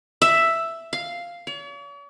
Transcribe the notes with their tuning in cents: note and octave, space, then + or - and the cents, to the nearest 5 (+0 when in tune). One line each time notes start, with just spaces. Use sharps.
E5 +5
F5 -5
C#5 +45